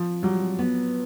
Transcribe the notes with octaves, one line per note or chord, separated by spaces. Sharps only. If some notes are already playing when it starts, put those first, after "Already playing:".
Already playing: F3
F#3 G3
B3